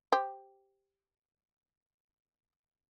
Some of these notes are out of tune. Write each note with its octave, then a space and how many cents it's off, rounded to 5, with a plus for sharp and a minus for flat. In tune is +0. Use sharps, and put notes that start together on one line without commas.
G4 +0 C5 +0